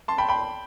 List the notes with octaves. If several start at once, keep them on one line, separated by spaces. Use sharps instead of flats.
A5 C6
G5 B5
G5 B5